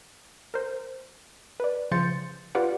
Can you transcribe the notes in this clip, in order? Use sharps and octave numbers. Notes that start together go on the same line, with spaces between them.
A#4 C5
B4 D5
C#3 F3 C6 G6 A6 C#7
F4 G4 B4 D5 F#5